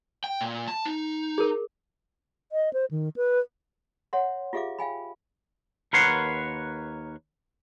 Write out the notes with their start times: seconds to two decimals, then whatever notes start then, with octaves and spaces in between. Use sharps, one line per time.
0.24 G5
0.41 A#2
0.68 A5
0.85 D#4
1.38 G#4 A#4
2.52 D#5
2.73 C5
2.91 D#3
3.16 B4
4.13 C#5 E5 F#5 C6
4.53 F4 G4 G#4 E5 F5 D6
4.79 F5 G5 G#5 B5
5.93 D#2 A#4 B4 C#5 F#5 C6